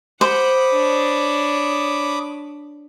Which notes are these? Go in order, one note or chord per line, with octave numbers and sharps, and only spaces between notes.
C5 F#5 B5 D6 D#6
D4 C#5